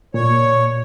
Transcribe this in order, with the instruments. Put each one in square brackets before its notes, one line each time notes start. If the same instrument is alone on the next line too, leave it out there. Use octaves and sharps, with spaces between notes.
[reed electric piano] A#2 [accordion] C#5